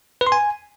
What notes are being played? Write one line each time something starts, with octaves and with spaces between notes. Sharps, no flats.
B4
C6
G#5